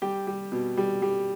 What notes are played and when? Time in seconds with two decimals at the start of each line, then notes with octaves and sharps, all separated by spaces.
0.02 G3 G4
0.27 G3
0.52 B2
0.77 G3
1.02 G3